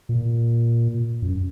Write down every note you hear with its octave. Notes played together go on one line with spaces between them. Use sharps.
A#2
F#2